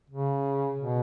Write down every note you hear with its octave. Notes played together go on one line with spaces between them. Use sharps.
C#3
B2